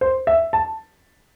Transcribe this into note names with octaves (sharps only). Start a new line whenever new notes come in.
C5
E5
A5